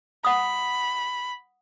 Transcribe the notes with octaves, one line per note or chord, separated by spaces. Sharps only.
F#5 B5 D#6